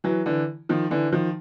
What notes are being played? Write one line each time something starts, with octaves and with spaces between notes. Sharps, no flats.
E3 F#3
D3 E3
D#3 F3
D3 E3
D#3 F3